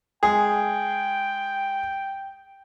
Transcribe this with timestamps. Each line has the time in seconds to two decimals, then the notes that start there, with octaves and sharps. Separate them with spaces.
0.23 G#3 G#4 G5